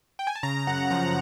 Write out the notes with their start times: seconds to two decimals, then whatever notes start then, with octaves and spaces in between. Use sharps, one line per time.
0.19 G5
0.27 G#5
0.35 A5
0.43 C#3 A#5
0.67 F#2 F#5
0.90 F3 A#5